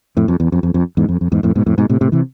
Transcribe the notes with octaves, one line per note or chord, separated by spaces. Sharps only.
F2 A2
F2
E2
F2
F2
F2
E2 G#2
F2
F2
E2 G#2
F2 A2
G#2 B2
F2 A2
G#2 B2
A2 C3
A2 C3
C3 E3